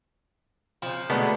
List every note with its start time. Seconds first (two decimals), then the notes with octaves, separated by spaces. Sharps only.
0.82 C#3 F3
1.10 B2 D3 G#3 A3 B3 A#4